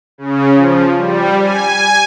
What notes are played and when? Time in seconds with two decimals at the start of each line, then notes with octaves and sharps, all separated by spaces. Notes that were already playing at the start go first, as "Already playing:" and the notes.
0.18 C#3
0.55 F3
0.97 G3
1.43 G#5